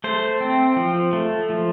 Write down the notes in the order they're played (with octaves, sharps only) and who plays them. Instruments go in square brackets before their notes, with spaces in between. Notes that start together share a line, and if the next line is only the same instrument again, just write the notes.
[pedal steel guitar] A3 C5
C4
F3
A3
F3